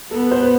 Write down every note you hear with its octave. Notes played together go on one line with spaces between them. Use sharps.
B3 A4
B4
C5
B4